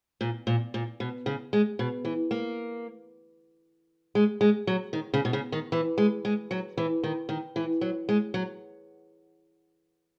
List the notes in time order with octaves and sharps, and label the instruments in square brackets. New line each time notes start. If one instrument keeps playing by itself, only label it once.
[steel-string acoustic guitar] A#2
A#2
A#2
B2
C#3
G#3
B2
E3
A#3
G#3
G#3
F#3
D#3
C#3
B2
C#3
D#3
E3
G#3
G#3
F#3
E3
D#3
D#3
E3
F#3
G#3
F#3